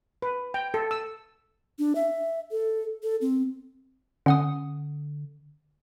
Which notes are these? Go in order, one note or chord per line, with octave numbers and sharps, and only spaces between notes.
B4
G5
A4
E6
D4
E5
A4
A4
C4
D3 C#4 F#5 D#6